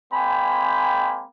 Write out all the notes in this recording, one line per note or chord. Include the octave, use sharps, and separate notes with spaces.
G#3 A#3 C4 G5 G#5 B5